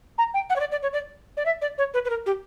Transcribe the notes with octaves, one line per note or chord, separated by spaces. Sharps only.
A#5
G5
F#5
C#5
D5
D5
C#5
D5
D5
E5
D5
C#5
B4
B4
A#4
G4